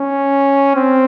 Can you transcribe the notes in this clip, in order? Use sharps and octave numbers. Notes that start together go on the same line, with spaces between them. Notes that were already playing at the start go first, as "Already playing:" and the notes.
Already playing: C#4
C4